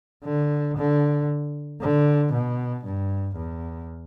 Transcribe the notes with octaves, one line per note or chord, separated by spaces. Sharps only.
D3
D3
D3
B2
G2
E2